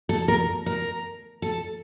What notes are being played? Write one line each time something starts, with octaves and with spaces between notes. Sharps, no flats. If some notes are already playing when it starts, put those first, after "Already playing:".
A4
A#4
A#4
A4